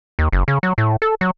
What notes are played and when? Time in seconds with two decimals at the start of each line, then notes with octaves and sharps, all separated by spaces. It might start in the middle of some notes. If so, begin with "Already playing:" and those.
0.19 D#2
0.32 F#1
0.48 C#3
0.63 F#3
0.78 A2
1.02 A4
1.21 F#3